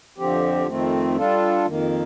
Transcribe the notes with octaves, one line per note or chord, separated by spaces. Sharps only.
F2 D3 F3 C4 G4
F2 D#3 A3 C4
G3 D4 F4 A4
F2 D#3 A#3